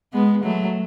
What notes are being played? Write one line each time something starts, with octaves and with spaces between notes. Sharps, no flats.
G#3 B3
F#3 A3